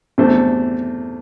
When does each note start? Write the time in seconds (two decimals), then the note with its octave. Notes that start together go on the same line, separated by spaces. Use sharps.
0.18 E2 C3 A3 D4 C5